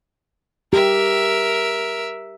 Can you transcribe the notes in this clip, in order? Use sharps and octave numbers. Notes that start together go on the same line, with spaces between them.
G4 A#4 E5